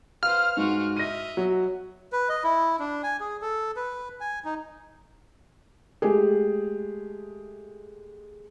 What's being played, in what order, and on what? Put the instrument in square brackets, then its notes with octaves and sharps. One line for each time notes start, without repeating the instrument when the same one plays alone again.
[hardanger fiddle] B4 C5 [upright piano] F5 [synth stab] F6
[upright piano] G#2 [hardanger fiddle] F4 F#4
[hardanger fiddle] D#5 E5 [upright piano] A#6 D#7
[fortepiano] F#3
[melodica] B4
D#5
E4
D4
G#5
G#4
A4
B4
G#5
D#4
[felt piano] G#3 A3 G4 G#4